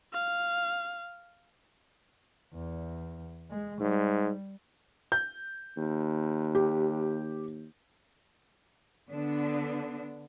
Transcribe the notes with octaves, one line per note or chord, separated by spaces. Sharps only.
F5
E2
G#3
G#2 G3
G6
D#2
G4
D3 B3 D4